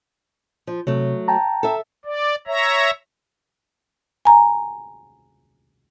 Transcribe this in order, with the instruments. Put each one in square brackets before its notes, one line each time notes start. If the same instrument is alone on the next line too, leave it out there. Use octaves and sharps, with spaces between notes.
[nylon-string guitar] F3
[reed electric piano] C3 [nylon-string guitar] F#3 A3
[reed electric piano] G5 A5 A#5
[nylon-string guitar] A4 E5
[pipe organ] D5
C#5 E5 A#5
[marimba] G#5 A#5